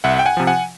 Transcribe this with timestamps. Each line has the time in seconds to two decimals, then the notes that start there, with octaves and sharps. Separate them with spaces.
0.04 C2 E5 F#5
0.19 G5
0.26 F#5 G#5
0.37 C3 F3
0.47 F#5 G#5